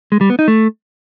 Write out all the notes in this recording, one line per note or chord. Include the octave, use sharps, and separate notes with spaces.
G#3
G3
B3
D#4
A3